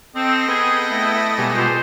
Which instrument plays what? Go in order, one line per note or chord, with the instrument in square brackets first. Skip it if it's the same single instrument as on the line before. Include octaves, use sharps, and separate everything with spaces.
[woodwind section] C4 [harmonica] A4 D#5
[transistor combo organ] B3 G5 [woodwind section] G#4
[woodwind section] A3 E4
[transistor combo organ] B2 G3 G#3
[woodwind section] F4 C5